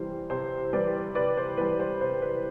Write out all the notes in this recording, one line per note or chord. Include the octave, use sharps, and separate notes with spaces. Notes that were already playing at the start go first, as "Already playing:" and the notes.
Already playing: C3 E3 G3 C5
C3 C5
E3 G3 B4 D5
C3 B4 D5
C5
E3 G3 B4
C5
C3 C5
B4